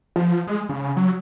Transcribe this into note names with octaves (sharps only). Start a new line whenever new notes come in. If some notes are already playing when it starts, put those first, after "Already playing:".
F3
G#3
C#3
F#3